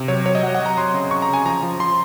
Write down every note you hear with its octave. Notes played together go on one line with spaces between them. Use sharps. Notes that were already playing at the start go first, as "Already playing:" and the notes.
Already playing: C3
F#3 C#5
F#3 C#5
D#5
F#3 F#5
F#5
F#3
A#5
F#3 C6
C#3
C#3 C#6
A#5
C#3
G#5
F3 A#5
F3
F3 C6